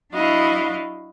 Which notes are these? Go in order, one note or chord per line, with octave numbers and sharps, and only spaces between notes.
F#3 D4 E4 F#4 D#5 F5